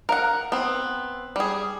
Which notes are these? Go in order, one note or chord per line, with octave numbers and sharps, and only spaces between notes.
A#4 F5 F#5
B3 C4
G3 G#4